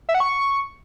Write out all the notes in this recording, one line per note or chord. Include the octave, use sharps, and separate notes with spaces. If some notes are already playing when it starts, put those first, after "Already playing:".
E5
F#5
C#6